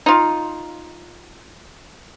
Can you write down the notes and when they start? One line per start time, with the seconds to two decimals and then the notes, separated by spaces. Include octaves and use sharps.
0.06 D#4 F4